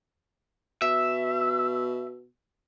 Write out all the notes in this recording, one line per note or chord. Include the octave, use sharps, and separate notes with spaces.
B2 E5